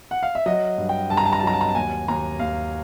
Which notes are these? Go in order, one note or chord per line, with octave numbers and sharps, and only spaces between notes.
F#5
F5
E5
F#3 D#5
G2
G5
G2 A5
A#5
A5
A#5
A5
F#3 A#5
A5
A#5
A5
D#2 G#5
D#2 A#5
D#2 F5